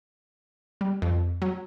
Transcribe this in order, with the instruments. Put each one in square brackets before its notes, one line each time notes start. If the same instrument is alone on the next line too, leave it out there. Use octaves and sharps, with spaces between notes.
[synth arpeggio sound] G3
F2
F#3